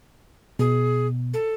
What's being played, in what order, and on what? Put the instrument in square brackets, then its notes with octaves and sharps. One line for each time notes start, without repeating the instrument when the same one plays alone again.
[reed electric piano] B2 [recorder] G#4
[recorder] A4